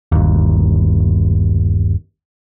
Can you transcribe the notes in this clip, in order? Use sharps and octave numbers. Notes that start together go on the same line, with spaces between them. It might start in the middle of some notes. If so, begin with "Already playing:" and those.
G1 D#2